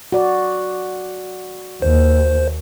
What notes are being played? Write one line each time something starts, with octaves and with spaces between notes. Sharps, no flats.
F#4 D5
D#2 C5